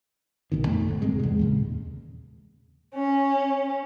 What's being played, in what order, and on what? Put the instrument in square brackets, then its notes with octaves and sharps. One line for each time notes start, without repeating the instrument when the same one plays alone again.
[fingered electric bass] A#1 B2 D#3
F2 A3
G#1
E1 G#2 C3 G#3
E2 G#3
D#2 A#2 C#3
[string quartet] C#4